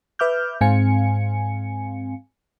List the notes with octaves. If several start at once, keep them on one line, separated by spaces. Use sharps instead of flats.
B4 E5 D6 F6 G6
G#2 C4 F5 G#5 C#7